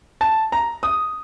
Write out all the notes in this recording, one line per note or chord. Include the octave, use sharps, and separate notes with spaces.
A5
A#5
D#6